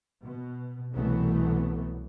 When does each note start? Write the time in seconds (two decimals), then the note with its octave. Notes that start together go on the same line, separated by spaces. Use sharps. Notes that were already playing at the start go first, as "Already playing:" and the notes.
0.22 B2
0.92 C2 B2 E3 F#3 A3 B3